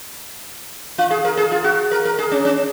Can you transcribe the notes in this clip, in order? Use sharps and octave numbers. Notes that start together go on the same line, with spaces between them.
F4
G#4
A#4
G#4
F4
F#4
A#4
A#4
G#4
C#4
C#4